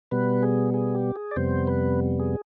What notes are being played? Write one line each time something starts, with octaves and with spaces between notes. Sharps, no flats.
B2 G3 B3 B4
G#4
G#4
G4
G#4
D5
F2 C3 G3 B3 C5
B4
G#4